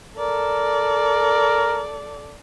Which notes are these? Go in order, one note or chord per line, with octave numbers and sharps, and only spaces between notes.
A4 A#4 D5